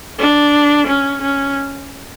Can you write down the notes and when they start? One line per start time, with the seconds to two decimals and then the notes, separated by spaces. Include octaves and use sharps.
0.18 D4
0.87 C#4
1.22 C#4